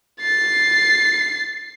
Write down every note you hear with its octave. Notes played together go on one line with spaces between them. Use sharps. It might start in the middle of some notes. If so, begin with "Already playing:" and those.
A6 C7